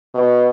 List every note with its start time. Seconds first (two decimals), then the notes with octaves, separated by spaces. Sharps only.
0.14 B2